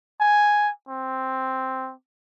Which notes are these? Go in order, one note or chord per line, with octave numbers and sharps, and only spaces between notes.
G#5
C4